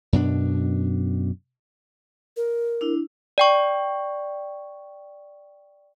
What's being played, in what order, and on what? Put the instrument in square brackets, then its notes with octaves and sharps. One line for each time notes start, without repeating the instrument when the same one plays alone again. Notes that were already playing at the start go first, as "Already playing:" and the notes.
[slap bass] F#2 B2 D4
[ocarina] A#4
[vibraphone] D4 E4
[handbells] D5 G5 C#6